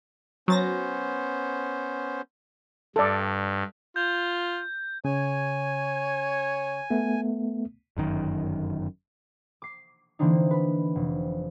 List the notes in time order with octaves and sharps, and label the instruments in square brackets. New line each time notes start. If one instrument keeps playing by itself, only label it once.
[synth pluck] F#3 A6 A#6 [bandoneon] B3 C#4 C5
[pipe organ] G2 [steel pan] A4 D5
[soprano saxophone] F4 [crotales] G6
[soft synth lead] C#3 [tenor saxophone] C#5 [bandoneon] G#5
[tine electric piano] A3 B3
[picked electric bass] G1 F#2 D#3
[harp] D6 C7
D3 E3 A#3 C4 D4 D#4
B4 B5
F1